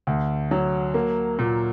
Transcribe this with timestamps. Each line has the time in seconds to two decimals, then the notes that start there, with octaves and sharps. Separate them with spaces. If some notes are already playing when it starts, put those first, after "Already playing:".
0.07 D2
0.51 F#3
0.94 A#3
1.39 A#2